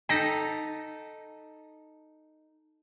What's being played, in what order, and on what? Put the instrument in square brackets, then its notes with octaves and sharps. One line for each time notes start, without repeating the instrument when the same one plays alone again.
[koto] D#4 A4 [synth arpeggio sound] G5 A#6 B6